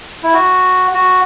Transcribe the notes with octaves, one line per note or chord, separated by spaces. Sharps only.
E4
F#4
F#4